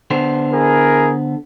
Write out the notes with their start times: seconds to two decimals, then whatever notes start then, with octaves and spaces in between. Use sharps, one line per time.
0.10 D3 B3 C5
0.52 E4 G#4 A#4